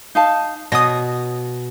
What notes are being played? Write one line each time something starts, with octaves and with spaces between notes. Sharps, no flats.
D#4 F5 A5
B2 C#5 D#6 A#6